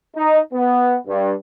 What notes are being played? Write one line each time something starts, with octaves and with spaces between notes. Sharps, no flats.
D#4
B3
G2